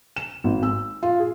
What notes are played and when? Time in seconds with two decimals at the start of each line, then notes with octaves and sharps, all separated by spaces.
0.16 E7
0.44 G#1
0.63 E6
1.03 F4
1.20 G#4